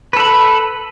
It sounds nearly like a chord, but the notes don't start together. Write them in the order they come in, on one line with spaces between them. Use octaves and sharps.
B4 A4 B5